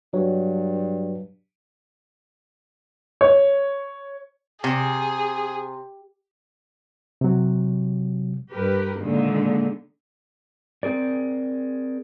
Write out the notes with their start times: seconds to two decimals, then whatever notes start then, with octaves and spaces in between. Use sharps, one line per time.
0.14 G2 F#3
3.21 C#5
4.64 C3 G#4
7.21 C3 F#3
8.52 G2 G4 A#4 B4
8.99 A#2 D3 D#3 G#3 A#3
10.83 C4 G#4 A#4 D5